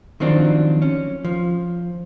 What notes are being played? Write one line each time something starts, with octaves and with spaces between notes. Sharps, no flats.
D#3 F3 F#3 C4 D4
C#4
F3